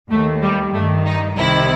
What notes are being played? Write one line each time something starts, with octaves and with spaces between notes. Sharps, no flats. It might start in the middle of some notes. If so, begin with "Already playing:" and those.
D#2 D#3 A3
G3
G2 D#3 A3
D#4
C2 C3 D#3 E4